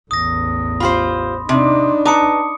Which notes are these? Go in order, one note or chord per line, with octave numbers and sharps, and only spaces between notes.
A1 E2 D#6 A#6
F4 G4 C5 B5 C6
C3 D4 D#4
B4 A5 A#5 D6 D#6 C#7